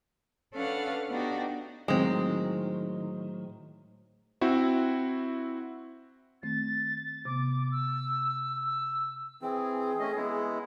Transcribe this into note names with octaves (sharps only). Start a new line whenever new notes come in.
C#4 D4 A4 B4 F5 F#5
B3 D4 D#4 F#4 G4
A2 D#3 F#3 G#3 C4
C4 E4 F#4
D#3 A3 C4 A6
C3 B3 D6
E6
E6
E3 C4 G#4
A3 C#4 D#5
G#3 B3 E4